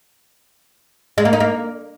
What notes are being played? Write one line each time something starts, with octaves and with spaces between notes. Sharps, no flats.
G#3
A#3
D#4
A#3